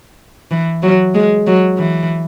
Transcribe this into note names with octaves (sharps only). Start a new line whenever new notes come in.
E3
F#3
G#3
F#3
E3